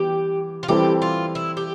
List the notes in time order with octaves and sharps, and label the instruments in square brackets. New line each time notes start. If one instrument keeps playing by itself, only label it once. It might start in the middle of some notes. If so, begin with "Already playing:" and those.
Already playing: [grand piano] E3 G3 B3 [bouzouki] G4
[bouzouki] F4
[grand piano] E3 G3 C4 E4 A4 [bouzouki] G4
[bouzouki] F4
E4
G4